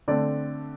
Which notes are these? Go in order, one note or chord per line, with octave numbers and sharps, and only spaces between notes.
D3 A3 C4 D5